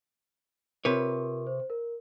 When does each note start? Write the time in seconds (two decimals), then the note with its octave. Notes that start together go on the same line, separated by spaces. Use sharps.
0.85 C3 F4 A#4 B4 C#5
1.47 C5
1.70 A#4